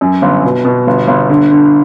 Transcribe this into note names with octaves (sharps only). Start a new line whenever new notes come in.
F#2
G1
B2
B2
G1
G1
D3
D3